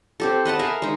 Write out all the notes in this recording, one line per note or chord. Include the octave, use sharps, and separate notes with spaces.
C4 G4 A4
B4 D#5 F#5 A5
G#4 A#4 E5 F5
G#3 D#4